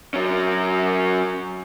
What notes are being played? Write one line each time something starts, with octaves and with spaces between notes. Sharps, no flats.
F#3 C#4